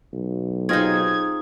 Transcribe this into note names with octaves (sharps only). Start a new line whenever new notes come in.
B1
C4 D#4 F4 G#4 D#5 G#6